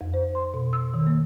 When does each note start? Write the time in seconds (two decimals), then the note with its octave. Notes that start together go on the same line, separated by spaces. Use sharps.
0.01 F2
0.14 C5
0.35 C6
0.54 B2
0.73 E6
0.94 D#3
1.07 A#3